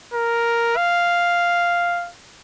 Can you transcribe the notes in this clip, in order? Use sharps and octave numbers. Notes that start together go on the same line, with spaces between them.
A#4
F5